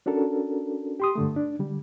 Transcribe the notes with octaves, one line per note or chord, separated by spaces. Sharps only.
C#4 D4 F#4 A4 A#4
G4 C6 D#6
G2 D3 A3
D4
D3 G3